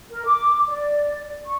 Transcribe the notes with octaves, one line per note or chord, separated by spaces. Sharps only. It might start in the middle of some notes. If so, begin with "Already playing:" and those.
A#4
D6
D5
C#6